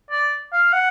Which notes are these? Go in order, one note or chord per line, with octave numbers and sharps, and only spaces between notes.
D5
F5
F#5